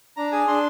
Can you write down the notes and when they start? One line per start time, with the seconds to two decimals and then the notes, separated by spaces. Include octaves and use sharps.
0.17 D4 A#5
0.32 G#4 G#5
0.47 D4 C6